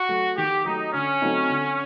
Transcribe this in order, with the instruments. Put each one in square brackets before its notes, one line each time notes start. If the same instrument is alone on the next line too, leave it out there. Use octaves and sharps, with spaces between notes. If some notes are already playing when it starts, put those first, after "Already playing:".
Already playing: [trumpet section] F#4
[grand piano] F#3 A3
[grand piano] D#3 [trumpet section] G4
[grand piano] F#3 A3 [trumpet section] D#4
[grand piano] D3 [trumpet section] C#4
[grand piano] F#3 A3 C4 D#4
D3